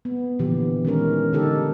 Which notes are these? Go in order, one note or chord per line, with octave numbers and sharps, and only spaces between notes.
B3
A#2 D3 E3 F3 G4
D#3 G#3 C#4 A#4
D3 D#4 G4 A4 A#4